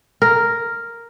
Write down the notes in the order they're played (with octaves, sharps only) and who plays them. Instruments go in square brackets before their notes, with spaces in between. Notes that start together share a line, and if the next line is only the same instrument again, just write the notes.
[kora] A#4